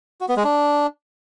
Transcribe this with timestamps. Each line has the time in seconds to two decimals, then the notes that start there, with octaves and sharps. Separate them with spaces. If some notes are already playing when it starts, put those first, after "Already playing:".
0.21 F#4
0.29 B3
0.36 G#3
0.44 D4